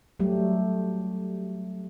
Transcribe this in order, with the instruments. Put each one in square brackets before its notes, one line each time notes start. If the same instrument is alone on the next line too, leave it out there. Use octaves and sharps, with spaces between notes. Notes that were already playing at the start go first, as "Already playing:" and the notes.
[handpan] F#3 G3 A3 G4